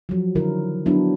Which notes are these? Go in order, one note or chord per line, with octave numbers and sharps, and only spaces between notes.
F3 F#3
D3 D#3 E4 A#4
F#3 B3 D4 E4